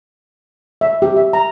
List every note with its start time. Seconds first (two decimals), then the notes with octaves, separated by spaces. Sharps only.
0.81 E5
1.02 G4
1.16 E5
1.33 A#5